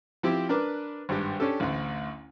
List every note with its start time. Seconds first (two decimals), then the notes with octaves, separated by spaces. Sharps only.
0.23 F3 C4 E4 G4
0.49 D4 A#4 B4 D6
1.09 G#1 G2 G4
1.40 C#4 D4 G4 A4
1.60 A1 D2